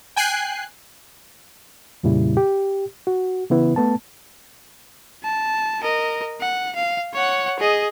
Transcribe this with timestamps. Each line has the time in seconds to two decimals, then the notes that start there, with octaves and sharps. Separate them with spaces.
0.16 G5 G#5 F#6 C7
2.03 F2 A#2 C#3 G3 E4
2.37 G4
3.07 F#4
3.50 C#3 E3 B3 E4 B4
3.76 A3 B3 A5
5.23 A5
5.81 A#4 D#5
6.41 F#5
6.76 F5
7.13 C#5 F#5
7.59 G#4 D#5